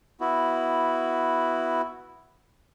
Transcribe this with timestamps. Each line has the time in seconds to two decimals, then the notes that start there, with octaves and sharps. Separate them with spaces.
0.21 B3 E4 F#4